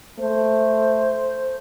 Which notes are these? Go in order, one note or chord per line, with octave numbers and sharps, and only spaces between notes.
A3 C5